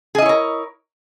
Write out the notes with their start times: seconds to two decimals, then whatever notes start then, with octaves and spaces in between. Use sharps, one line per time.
0.15 G#4
0.18 D#5
0.22 E4
0.26 C#5
0.29 A#4